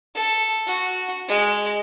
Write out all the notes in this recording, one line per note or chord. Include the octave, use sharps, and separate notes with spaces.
A4
F#4
G#3